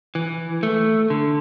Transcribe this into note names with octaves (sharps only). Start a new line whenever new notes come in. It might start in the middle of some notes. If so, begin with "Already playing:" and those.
E3
A3
D3